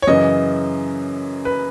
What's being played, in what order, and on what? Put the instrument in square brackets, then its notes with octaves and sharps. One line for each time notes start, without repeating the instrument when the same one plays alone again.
[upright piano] C#5
F#2 C#3 E3 D#5
B4